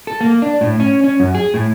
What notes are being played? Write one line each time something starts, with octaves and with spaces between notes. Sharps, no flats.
A4
A#3
D4
A2
C#4
C#4
F#2
G#4
A2